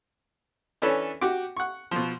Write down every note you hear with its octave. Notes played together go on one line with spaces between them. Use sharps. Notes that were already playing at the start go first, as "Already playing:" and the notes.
E3 C#4 D4 A4 B4 C#5
F#4 G4 D6
F#5 C#6
B2 F3